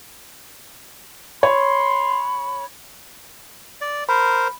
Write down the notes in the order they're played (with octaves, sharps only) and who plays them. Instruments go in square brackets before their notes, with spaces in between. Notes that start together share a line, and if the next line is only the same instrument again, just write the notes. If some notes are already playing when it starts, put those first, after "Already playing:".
[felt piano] C#5 [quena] B5 [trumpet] C6
[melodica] D5
[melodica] A#4 C5 [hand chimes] B5